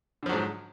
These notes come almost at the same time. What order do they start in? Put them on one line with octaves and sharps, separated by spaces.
D3 F3 F#3 G#2